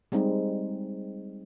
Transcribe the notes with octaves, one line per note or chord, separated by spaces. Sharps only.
G3 G#3 C4 D#4